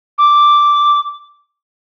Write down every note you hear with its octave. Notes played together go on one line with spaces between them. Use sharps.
D6